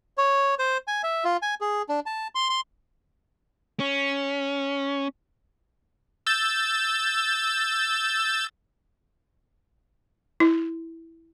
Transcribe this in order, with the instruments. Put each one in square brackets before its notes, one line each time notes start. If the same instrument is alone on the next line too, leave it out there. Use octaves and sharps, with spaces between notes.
[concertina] C#5
C5
G#5
E5
F4
G#5
G#4
D4
A5
C6
C6
[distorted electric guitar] C#4
[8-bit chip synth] E6 G6 A6
[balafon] E4